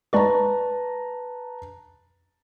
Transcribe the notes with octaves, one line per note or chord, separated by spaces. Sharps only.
G#3 B4 D5 A5 A#5 C#6